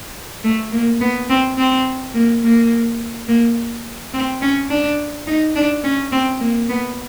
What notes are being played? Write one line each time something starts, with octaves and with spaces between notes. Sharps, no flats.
A3
A#3
B3
C4
C4
A#3
A#3
A#3
C4
C#4
D4
D#4
D4
C#4
C4
A#3
B3